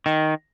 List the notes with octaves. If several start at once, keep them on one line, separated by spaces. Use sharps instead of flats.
D#3